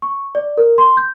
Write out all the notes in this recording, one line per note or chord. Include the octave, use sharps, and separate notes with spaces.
C#6
D5
A#4
C6
G6